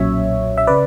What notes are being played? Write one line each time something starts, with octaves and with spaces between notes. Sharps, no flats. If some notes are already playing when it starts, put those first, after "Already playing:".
Already playing: B1 A#2 F#3 C#4 C#5 E5
E5
C#3 B4 D5